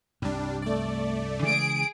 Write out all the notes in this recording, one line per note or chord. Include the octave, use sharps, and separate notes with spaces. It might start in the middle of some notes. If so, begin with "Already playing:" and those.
C2 G2 G3 D4
A3 D5
C#3 E3 G#3 G#4 D#6 D7